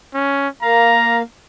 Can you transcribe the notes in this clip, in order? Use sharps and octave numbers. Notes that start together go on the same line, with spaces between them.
C#4
A#3 F5 A#5